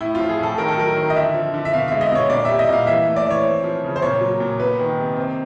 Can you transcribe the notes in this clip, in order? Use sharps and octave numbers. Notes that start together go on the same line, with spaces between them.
A2 E4
F4
F3
G#4
A2 A4
D#3 A#4
A4
F#3 A#4
D#3
D#5
D3 E5
F3
D3
E5
B2 F5
G#3 E5
D#5
B2 C#5
A#2 D5
G3 E5
D#5
A#2 F5
E3 E5
A3
D5
E3 C#5
C4
F3
C#3
C5
A#2 C#5
F#3
A#2
B3 B4
D#3
C3
C4